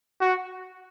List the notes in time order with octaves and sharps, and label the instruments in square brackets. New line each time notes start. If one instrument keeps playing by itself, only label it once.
[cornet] F#4